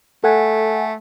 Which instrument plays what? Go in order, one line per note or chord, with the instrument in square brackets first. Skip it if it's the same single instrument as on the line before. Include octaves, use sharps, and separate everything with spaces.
[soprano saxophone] A3 [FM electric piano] A4 F#5 G#5